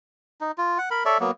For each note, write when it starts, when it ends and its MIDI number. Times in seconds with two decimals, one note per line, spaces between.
0.41 0.51 63
0.58 0.78 65
0.78 0.89 78
0.91 1.03 70
0.91 1.03 83
1.05 1.18 69
1.05 1.18 73
1.05 1.18 74
1.05 1.18 76
1.20 1.31 54
1.20 1.31 58
1.20 1.31 59